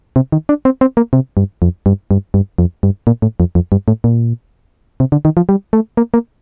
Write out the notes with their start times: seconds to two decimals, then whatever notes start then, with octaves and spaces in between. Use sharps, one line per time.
0.16 C3
0.32 D#3
0.49 D4
0.65 C4
0.81 C4
0.97 A#3
1.13 C3
1.37 G2
1.62 F2
1.86 G2
2.11 G2
2.34 G2
2.58 F2
2.83 G2
3.07 A#2
3.22 A2
3.40 F2
3.55 F2
3.72 G2
3.88 A2
4.04 A#2
5.00 C3
5.12 D3
5.25 D#3
5.37 F3
5.49 G3
5.73 A3
5.97 A#3
6.14 A#3